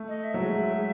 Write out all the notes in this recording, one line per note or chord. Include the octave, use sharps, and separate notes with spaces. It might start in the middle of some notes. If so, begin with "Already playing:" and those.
Already playing: A3
D#5
E5
F#3
G#3
G#3
G#3